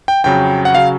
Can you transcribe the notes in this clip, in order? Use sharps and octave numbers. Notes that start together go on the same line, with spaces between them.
G5
F2 C#3 F#3 G5
F#5
C#3 F#3 F5